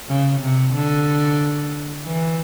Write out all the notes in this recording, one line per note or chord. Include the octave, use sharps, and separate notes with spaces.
C#3
C3
D3
E3